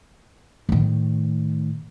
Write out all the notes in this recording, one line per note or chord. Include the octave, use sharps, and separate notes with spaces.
A2 D#3